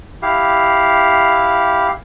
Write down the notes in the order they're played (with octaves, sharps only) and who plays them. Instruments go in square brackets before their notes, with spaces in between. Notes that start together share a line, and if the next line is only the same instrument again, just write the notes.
[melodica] E4 G4 F5